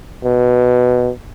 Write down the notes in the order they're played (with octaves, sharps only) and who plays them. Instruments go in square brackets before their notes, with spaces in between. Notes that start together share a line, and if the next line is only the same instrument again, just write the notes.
[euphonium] B2